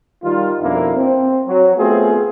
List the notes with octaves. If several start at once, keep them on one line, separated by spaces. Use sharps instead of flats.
D#3 G3 F4
F2 B2 A#3 D4 E4
C4
F#3
A3 B3 C4 F4 G#4